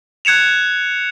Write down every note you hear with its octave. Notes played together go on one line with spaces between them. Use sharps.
F#6 G#6 C#7 E7 F7